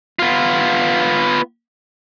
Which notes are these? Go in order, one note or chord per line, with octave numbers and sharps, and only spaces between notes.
B3 F4